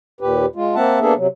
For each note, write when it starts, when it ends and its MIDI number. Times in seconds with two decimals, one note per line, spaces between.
0.21 0.46 39
0.21 0.46 46
0.21 0.46 67
0.21 0.46 71
0.56 0.75 56
0.56 0.75 65
0.75 0.99 58
0.75 0.99 60
0.75 0.99 76
0.75 0.99 78
0.75 0.99 81
1.01 1.13 58
1.01 1.13 59
1.01 1.13 62
1.01 1.13 68
1.01 1.13 69
1.01 1.13 76
1.16 1.27 48
1.16 1.27 54